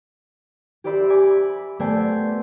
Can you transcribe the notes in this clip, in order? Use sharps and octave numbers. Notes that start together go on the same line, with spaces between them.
G4 C5 D5 E5 B5 E6
G#5 B5 D6
B5
A3 B3 C5 D5 G5 G#5